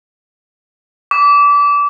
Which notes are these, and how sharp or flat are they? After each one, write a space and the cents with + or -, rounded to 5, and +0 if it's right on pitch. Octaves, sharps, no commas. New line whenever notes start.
D6 -25